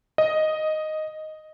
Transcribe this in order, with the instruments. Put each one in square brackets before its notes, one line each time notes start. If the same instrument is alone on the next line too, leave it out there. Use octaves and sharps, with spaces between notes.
[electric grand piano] D#5